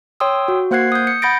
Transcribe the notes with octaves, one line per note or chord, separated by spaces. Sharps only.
C#5 G5 C6 D#6 E6
F#4
A#3 C5 F#5 F#6 G#6 C7
D#6 G6
C#7
F#5 B5 G6 A6 A#6 D7